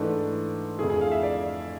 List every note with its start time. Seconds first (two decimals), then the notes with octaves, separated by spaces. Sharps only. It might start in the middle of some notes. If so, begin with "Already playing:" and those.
Already playing: G#2 E3 A3 D4
0.79 F2 D3 A3 E4 G#4
0.90 G#4
1.01 F5
1.12 E5
1.23 D5